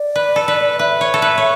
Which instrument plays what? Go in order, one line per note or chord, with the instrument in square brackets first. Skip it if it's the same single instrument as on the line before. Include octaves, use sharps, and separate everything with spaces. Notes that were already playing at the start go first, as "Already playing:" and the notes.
Already playing: [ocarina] D5
[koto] B4
A4
B4
[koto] B4 [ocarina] E5
[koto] C#5
A4
B4
C#5